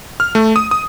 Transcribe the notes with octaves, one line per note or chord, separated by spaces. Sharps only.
F6
A3
D#6
D#6